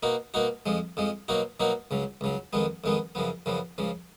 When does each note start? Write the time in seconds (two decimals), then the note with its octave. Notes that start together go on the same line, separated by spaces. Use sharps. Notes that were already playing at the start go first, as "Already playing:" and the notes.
0.03 B2 A#3 D#4 F#4
0.34 B2 A#3 D#4 F#4
0.66 F2 F3 G#3
0.97 F2 F3 G#3
1.28 B2 F#3 A#3 D#4 F#4
1.60 B2 F#3 A#3 D#4 F#4
1.91 C#2 C#3 F#3
2.21 C#2 C#3 F#3
2.53 F2 D#3 G#3 B3
2.84 F2 D#3 G#3 B3
3.15 F#2 C#3 F3 B3
3.46 F#2 C#3 F3 B3
3.78 C#2 C#3 F3